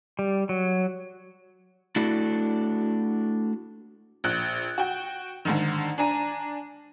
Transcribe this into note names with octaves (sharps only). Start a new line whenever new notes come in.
G3
F#3
A3 D4 E4 F#4 A4
A#1 F#6
F#4 G5
G#2 D3 D#3
D4 G#5 A#5 D#7